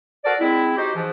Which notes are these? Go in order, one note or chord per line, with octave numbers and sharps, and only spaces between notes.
F#4 A4 A#4 C5 D5
G#3 C4 E4
D#4 F#4 G4 C5
G#2 E3 F3